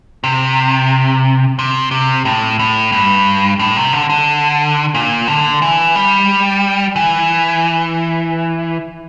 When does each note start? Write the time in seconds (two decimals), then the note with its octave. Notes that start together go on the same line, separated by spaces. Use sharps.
0.24 C3
1.59 C3
1.91 C3
2.25 A2
2.59 A2
2.92 G2
3.59 A2
3.76 C3
3.93 D3
4.09 D3
4.94 A#2
5.28 D3
5.62 E3
5.95 G3
6.96 E3